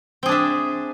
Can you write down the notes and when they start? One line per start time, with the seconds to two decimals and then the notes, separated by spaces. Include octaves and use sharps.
0.23 C4
0.26 G#4
0.29 D4
0.32 E5